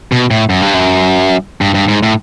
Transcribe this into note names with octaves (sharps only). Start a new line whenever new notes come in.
B2
A2
F#2
G2
F#2
G2
G2
G#2
A2